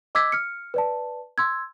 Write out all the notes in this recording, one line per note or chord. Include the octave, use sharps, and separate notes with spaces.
D#5 D6 E6 G#6 B6
F6 C#7
B4 D5 A5
C6 E6 G#6